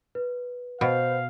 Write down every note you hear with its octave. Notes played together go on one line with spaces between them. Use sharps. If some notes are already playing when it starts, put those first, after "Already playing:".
B4
B2 C5 F5